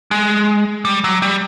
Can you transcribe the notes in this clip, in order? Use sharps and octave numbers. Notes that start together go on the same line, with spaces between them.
G#3
G3
F#3
G3